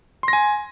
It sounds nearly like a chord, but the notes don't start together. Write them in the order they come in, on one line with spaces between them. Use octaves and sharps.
C6 A#6 G#5